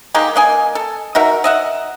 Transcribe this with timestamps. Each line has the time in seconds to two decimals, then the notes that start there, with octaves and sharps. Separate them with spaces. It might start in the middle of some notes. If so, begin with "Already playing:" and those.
0.15 G#3 A#3 D#4 G4
0.36 A#3 D#5 G#5
0.75 A4
1.15 D#4 F#4 A#4 E5
1.44 D#5 E5 F#5